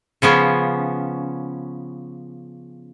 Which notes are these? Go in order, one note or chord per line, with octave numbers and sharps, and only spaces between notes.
C#3 F3 B3 C#4